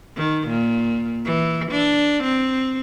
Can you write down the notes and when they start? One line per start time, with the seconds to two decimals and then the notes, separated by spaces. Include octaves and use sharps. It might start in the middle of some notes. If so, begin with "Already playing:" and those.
0.17 D#3
0.48 A#2
1.25 E3
1.71 D4
2.23 C4